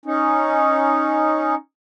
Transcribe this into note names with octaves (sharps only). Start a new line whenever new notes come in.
C#4 D#4